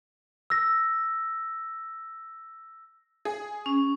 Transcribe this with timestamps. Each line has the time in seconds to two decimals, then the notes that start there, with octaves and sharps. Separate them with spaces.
0.50 E6 A#6
3.25 G#4
3.66 C#4